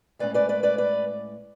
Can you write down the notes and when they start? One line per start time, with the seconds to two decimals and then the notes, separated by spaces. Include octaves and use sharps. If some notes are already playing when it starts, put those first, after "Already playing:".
0.19 A2 G#3 C#4 B4 D5
0.34 B4 D5
0.49 B4 D5
0.63 B4 D5
0.78 B4 D5